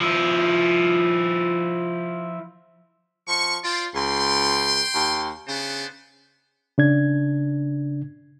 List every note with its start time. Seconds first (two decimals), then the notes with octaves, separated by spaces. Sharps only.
0.01 F3 E4
3.28 F3 C#6
3.64 F4 C5 D5
3.95 C#2 G5 C6
4.94 D#2
5.48 C#3 B3 D4 C5
6.78 C#3 D4 G#6